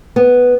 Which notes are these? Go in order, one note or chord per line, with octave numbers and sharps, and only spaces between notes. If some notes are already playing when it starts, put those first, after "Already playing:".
B3